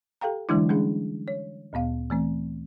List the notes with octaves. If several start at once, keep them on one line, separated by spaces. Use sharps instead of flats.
G4 A4 F5 G5 A#5
D3 E3 F#3 G#3 D4 E4
G3 G#3 C#4 D4 G#4
C#5
D2 A#2 B3 F5
E3 A3 C4